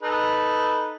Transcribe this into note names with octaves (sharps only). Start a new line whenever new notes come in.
D#4 A4 B4